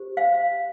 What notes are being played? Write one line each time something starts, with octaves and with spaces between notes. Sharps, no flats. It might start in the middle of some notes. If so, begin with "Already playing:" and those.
Already playing: G4 C5
F5